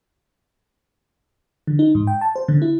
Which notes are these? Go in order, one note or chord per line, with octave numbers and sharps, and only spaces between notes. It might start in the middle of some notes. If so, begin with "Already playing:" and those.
D3
D#4
G#2
G5
A5
C5
D3
E4